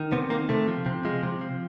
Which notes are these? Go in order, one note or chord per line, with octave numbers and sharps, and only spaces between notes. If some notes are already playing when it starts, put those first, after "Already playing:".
Already playing: D#3
C3 B3
D#3 A#3
C3 A3
F3
C3
F3 G#3
C3
F3